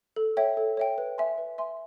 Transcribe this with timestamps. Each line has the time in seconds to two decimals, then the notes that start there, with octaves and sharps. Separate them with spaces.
0.16 A4
0.37 C#5 E5 G5
0.57 A4
0.77 C#5 E5 G5
0.98 B4
1.18 E5 G#5 C6
1.38 B4
1.58 E5 G#5 C6